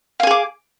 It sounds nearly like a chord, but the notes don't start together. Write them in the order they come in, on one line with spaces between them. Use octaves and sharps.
F5 G#5 G#4 D6